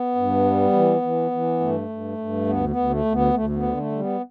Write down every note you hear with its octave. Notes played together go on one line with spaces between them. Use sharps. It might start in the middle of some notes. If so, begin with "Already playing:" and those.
Already playing: B3
G2
G3
E3
E3
E3
G2 A3
G2
G2
D2 B3
B3
D2
A3
D2
B3
D2 A3
A3
B3
D3
A3
G3
B3